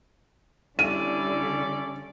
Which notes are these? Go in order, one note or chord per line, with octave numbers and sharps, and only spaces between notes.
D3 G3 C#4 E4 A4 D5 D#7